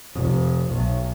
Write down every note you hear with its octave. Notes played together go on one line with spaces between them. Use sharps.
F1
B1